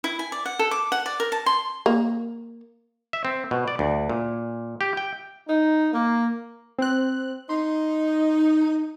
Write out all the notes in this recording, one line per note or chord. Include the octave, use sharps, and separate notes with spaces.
E4
G#5
D5
F#5
A4
D6
F#5
D5
A#4
A5
C6
A#3
E5
C4
B2
D5
D2
A#2
G4
G5
D#4
A#3
C4 F#6
D#4 C6